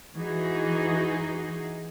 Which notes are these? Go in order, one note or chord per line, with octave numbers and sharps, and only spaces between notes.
E3 D#4 F#4 G#4